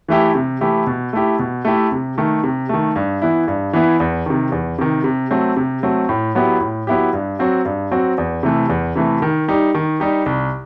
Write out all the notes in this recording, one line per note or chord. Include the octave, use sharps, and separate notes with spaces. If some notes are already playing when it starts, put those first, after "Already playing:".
E3 A3 E4 G4
C3
E3 A3 E4 G4
B2
A3 E4 G4
B2
A3 E4 G4
C3
D#3 A3
C3
D#3 A3
G2
E3 B3 E4
G2
E3 B3 E4
E2
C3 D#3
E2
C3 D#3
C3
F#3 A3 C4
C3
F#3 A3 C4
A2
F#3 B3 E4 G4
A2
F#3 B3 E4 G4
G2
F#3 C4 F#4
G2
F#3 C4 F#4
E2
C3 E3 A3
E2
C3 E3 A3
D#3
G3 D#4 G4
D#3
G3 D#4 G4
C2